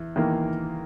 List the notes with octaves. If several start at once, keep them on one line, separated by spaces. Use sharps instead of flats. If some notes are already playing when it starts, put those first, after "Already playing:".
Already playing: E2
E2 D#3 A#3